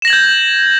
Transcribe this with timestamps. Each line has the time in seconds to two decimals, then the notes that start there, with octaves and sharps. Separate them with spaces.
0.02 E7
0.05 A#6
0.08 F#7
0.10 G#6
0.13 G6